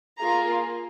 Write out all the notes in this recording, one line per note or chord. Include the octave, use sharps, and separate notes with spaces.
A#3 F4 G#4 A#5